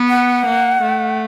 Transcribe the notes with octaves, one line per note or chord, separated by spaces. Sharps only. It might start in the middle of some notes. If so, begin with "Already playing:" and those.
Already playing: B3
F#5
A#3
A3